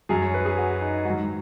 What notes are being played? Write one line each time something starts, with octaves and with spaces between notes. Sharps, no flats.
F#2 F#3 G#4
C#5
B4
G#4
F#4
D#4
G#2 D#3 F#3 F#4